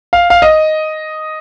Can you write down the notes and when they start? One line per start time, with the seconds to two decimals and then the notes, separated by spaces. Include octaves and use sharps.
0.13 F5
0.30 F5
0.42 D#5